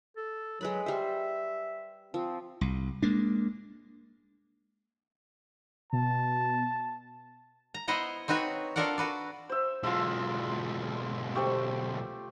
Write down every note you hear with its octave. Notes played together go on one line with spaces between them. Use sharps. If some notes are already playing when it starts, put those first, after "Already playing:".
A4
F#3 G#3 B4 B5
G3 C5 E5
F3 C4
C2
G#3 A#3 D4
B2 A5
A#5
B3 E4 C5 D#5 F#5 A#5
C4 D#4 F#4 B4 C#5
D4 F4 A4 A#4 D5 F#5
F#4 B4 D5
C5 E5
B1 G#3 F4 E5
A3 G4 C5